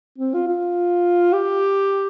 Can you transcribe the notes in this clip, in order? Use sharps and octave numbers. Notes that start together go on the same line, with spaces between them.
C4
F4
F4
G4